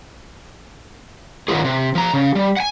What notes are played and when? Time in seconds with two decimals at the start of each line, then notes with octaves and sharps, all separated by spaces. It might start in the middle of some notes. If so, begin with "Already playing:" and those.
1.48 D#3 F#3 G3 F4 G#4
1.65 C3
1.95 F3 A#5
2.14 C#3
2.35 G3
2.57 F#5 G#5